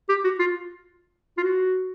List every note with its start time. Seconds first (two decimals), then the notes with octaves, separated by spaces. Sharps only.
0.09 G4
0.24 F#4
0.39 F4
1.38 F4
1.43 F#4